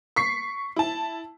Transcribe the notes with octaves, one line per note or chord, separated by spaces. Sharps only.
C#6 B6 C7
E4 A5